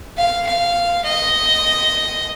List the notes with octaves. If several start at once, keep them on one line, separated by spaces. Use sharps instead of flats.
F5
F5
D#5